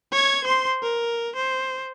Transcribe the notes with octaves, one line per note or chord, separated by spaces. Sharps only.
C#5 G#6
C5 C6
A#4
C5